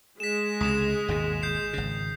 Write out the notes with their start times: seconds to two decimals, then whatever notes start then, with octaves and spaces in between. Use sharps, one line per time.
0.20 G#3 B6 E7
0.61 C#2 C3 D#6 E7
1.08 G#1 D#2 B2
1.43 G6 C7
1.73 G#1 C#3